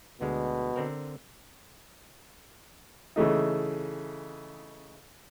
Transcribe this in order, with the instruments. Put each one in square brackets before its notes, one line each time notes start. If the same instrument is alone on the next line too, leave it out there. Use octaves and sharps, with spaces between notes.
[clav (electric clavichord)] D2 D3 G#3 [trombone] B2
[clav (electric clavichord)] D3 C4 A#4
[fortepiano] C#3 E3 A3 D#4